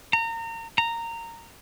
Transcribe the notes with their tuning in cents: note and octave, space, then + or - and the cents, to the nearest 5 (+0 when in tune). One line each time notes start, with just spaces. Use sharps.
A#5 -30
A#5 -15